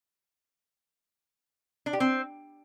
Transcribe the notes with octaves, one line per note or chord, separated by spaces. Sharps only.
D4
G4
C4